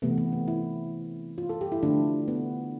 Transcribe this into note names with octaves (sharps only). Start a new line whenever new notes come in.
C3 E3 A3 B3
B3
C4
E4
F4
A4
G4
E4
D3 F3 A3 D4
B3